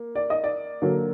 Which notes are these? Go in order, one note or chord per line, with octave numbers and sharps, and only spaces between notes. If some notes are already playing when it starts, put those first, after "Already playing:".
Already playing: A#3
D5
D#5
D5
D3 F#3 A#3